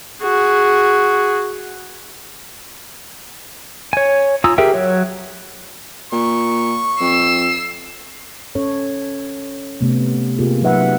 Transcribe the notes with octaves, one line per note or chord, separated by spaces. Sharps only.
F#4 G#4
C#5 G#5
F4 G#5 A#5 D#6 E6
G4 G#4 A#4 E5 G5
F#3 C#5
A#2 C#6
F2 E6 C7
C#4 A4 C#5
C3 A3 B3
C3 A#3 F4 G4 G#4
F#3 C4 D#4 B4 E5 F#5